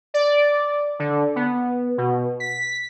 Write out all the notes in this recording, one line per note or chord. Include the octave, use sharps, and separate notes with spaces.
D5
D3
B3
B2
B6